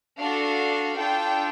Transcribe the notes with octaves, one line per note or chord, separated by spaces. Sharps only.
D4 F#4 A4 F5
D4 F4 A4 G5